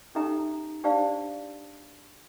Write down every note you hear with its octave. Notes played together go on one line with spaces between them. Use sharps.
C#4 D#4 G4 A4 E5 A#5
D4 G4 C5 D5 F5 A5